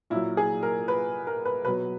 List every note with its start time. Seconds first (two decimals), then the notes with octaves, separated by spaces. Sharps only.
0.10 A#2 E4
0.15 F#3
0.37 G#4
0.63 A#4
0.88 B4
1.27 A#4
1.45 B4
1.65 B2 F#3 B4